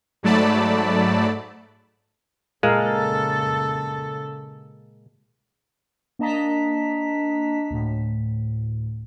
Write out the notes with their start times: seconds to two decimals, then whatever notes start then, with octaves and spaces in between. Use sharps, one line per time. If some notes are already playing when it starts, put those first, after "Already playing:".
0.23 G#2 F#3 A3 D5 A5 B5
2.63 A#2 C#3 G#3 A4 A#4 F5
6.19 A#3 D4 D#5 A5 A#5 B6
7.71 D2 A2